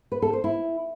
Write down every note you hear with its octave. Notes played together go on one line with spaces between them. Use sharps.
B4
A4
C5
E4